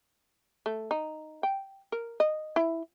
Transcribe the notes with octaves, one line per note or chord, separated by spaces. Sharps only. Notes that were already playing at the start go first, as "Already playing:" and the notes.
A3
D#4
G5
A#4
D#5
E4